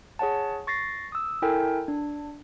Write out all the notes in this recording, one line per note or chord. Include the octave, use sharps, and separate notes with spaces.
G#4 C#5 F#5 A5
C#6 A6 A#6 C7
D#6 E6
E4 A4 A#4 G5 G#5
D4